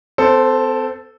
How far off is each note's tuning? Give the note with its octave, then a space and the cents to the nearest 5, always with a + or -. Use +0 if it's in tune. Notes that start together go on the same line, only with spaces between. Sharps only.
C4 -45 A4 +0 C5 +0